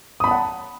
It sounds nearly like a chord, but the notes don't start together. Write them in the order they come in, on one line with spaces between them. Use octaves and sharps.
D#6 B5 A5 F#5